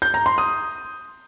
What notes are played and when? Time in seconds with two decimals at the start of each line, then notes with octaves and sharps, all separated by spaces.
0.02 G6
0.14 A#5
0.26 C6
0.38 D#6